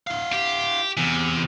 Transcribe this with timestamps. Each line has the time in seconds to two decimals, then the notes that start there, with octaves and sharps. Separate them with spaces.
0.07 E4 F5
0.33 G4
0.97 E2 C3 E3